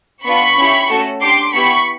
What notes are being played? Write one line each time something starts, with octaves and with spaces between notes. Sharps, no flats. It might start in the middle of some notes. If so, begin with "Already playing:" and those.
B3 D4 F4 B5 C#6
C#4 E4 G4
A3 C#4 F#4 A4
D4 G4 C6 D6
B3 E4 G4 B5 C#6